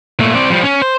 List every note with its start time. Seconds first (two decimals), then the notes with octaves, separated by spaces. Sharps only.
0.20 A#2 A3
0.35 C4 D5
0.50 F3 G3
0.63 C#4
0.82 C5